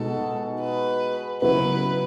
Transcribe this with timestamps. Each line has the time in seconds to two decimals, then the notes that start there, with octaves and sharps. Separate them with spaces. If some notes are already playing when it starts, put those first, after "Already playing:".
Already playing: B2 G#3 D#4 A4
0.61 B4
1.42 C#3 F#3 B3 E4 B4